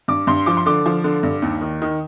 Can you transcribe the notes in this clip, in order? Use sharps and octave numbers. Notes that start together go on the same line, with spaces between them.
G2 D6
G2 C6
F3 D6
C6
D3 D6
F3
D3
G2
D#2
D#3
D#3